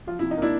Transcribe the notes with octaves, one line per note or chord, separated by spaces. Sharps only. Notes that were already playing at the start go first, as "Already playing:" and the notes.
F3 F4
C3 E4
D#4
A#3 D4 E4